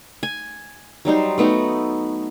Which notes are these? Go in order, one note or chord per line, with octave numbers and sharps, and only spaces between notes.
G#5
F#3 G3 D#4 C5
A3 B3 D#4 F#4